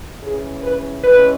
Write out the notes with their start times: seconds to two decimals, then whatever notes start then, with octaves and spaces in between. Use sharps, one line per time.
0.22 C#3 E3 C#4 G#4
0.63 B4
1.03 E3 G#3 C#4 B4